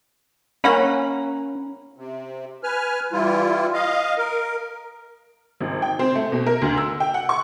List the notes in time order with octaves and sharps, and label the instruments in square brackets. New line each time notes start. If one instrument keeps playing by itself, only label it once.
[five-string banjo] A#3 F#5 B5 [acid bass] C#4
[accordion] C3
B4 G#5 F6
E3 G3 E4 F4
D#5 F5
A#4
[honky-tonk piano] G#1
G5
C4
A3
B2
A#4
D2
E6
G5
F#5
C#6